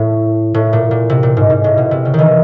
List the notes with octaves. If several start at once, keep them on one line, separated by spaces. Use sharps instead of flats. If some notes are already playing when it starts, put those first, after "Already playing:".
Already playing: A2
A2
A#2
A#2
C3
A#2
G#2
G#2
A2
B2
C3
C#3
D#3 E3